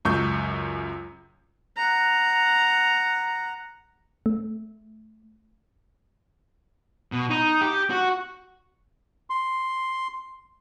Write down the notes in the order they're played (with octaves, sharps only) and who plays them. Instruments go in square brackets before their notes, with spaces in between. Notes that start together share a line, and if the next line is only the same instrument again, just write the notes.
[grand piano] C#2 F#2 C#6 G6
[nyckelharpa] F#5 A#5
[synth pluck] A3
[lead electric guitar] B2
D#4
G4
F#4
[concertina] C6